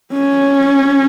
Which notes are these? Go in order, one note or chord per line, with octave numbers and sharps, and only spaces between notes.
C#4